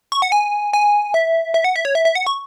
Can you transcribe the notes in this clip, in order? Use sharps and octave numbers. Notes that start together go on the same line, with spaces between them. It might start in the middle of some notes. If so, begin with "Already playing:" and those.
C#6
F#5
G#5
G#5
E5
E5
F#5
E5
C#5
E5
E5
F#5
C#6